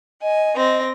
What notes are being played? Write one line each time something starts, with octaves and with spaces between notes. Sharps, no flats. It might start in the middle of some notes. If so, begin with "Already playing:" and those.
D#5 G#5
C4 D#5 A#6